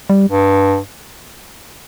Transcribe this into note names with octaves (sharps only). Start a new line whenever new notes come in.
G3
G2